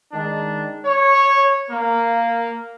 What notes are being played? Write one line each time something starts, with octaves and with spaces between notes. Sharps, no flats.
D#3 G#3 D4
C#5
A#3